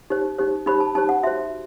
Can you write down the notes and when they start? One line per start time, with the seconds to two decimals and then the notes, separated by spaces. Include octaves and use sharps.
0.10 D#4 G4 C5
0.39 D#4 G4 C5
0.66 D#4 G4 C5 B5
0.80 A5
0.95 D#4 G4 C5 A5
1.09 F#5
1.23 F#4 C5 E5